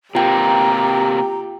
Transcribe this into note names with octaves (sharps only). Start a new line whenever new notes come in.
C3 A#3 F4 G4 G5 A#5